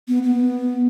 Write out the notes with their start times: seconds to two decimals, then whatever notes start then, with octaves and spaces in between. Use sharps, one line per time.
0.08 B3
0.23 B3